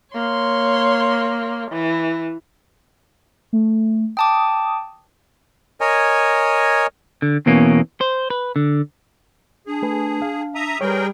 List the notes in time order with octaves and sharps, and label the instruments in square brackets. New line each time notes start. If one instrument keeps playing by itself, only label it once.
[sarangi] A#3 [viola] C#5 C6
[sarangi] E3
[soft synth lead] A3
[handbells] G5 A5 D6 [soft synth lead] D#6
[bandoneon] A#4 C#5 D#5 G#5
[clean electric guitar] D3
E2 B2 E3 A#3 C#4
C5
B4
D3
[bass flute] D4 [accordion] G#4
[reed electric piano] A3 B4 G#5
F5
[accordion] E5 A#5 D#6
[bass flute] G3 [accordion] G#4 A#4 G5 [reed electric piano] B4 C#5